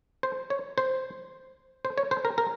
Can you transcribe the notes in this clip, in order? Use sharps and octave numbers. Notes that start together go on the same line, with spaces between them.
C5
C#5
C5
C5
C#5
C5
A#4
A#4